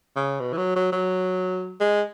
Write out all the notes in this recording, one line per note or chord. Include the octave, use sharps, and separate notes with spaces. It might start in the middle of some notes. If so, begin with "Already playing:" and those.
C#3
B2
E3
F#3
F#3
F#3
G#3